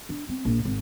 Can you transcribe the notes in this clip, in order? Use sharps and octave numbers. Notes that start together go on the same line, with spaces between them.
D4
C4
A#1
G#1